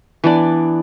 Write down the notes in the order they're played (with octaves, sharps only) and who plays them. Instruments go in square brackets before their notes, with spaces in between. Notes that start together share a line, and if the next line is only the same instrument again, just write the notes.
[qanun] E3 B3 D4 D5